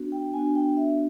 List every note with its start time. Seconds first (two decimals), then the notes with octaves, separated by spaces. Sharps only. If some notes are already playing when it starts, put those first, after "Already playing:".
Already playing: B3 D4 F#4
0.12 G5
0.34 B3 D4 F#4 G#5
0.55 G5
0.77 E5